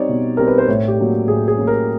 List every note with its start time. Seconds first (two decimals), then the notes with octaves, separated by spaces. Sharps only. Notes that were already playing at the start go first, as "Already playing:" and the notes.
Already playing: G3 C4 D#4 C#5 D5
0.09 B2
0.37 G3 C4 D#4 A#4
0.48 B4
0.58 C5
0.68 A2 C#5
0.88 G4
0.99 F#3 A#3 C#4
1.28 A2 G#4
1.48 G#4
1.57 F#3 A#3 C#4
1.67 A#4